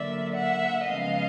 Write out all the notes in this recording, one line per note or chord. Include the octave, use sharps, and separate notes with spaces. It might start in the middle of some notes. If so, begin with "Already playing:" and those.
Already playing: D3 F#3 A#3 D5 E5
E5 F#5
C#3 F3 G#3 B3 D#5 F5